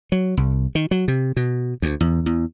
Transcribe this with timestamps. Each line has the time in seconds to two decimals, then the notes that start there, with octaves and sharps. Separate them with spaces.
0.12 F#3
0.37 C2
0.75 D#3
0.91 F#3
1.08 C3
1.37 B2
1.82 D2
2.00 E2
2.26 E2